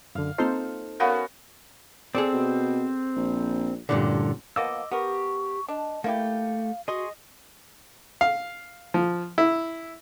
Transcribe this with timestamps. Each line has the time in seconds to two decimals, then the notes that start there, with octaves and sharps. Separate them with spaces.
0.15 F#2 D3 F5
0.38 A#3 C4 D#4 F4 A4 C5
1.00 B3 C#4 F#4 A#4 F5 F#5
2.15 C4 G#4 A4 D5
2.33 B2
3.16 A#1
3.89 A1 G2 A#2 D3
4.56 F3 A#3 B3 D#5 F5 D6 E6
4.92 B3 G4 A#4 C#6
5.69 D4 D#5
6.04 A3 A#3 E4 G4 F5
6.88 F#4 G#4 D#5 C6 C#6
8.21 F5
8.94 F3
9.38 E4